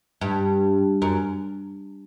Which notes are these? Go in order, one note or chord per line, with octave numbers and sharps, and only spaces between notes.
G2
F#2